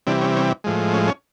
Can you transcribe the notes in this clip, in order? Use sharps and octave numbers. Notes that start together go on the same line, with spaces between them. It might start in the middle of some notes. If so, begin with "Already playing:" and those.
C3 E3 G3 D4
C#4
C#4
A2 F3 G#3
C#4
C#4